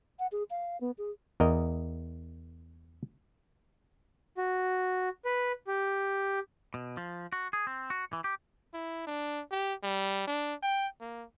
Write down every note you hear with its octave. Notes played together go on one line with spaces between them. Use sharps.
F#5
G#4
F5
B3
G#4
E2 A#4 D#5
F#4
B4
G4
B2
F3
F#4
G#4
C4
F#4
E3
G4
E4
D4
G4
G3
D4
G5
A#3